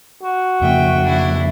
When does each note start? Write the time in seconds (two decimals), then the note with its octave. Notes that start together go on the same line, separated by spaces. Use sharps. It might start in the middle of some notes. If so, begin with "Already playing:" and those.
0.23 F#4
0.61 F2 C#3 A#3 E5 G5
1.04 D4 E4